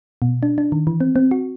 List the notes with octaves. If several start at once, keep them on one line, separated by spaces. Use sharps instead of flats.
B2
D4
D4
D#3
E3
C4
C4
F#4